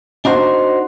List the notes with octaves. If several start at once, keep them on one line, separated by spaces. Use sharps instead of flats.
D4 D#4 F#4 C5